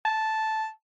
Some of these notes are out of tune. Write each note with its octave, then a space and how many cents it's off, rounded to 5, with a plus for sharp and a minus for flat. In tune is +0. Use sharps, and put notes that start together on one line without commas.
A5 -5